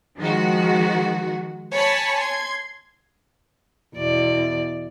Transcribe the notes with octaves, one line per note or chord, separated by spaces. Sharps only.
D#3 F3 G#3 F#4
C#5 G#5 A5 B5 C#6
C6 G#6
E2 B2 D5